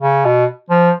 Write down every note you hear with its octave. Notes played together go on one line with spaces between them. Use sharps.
C#3
B2
F3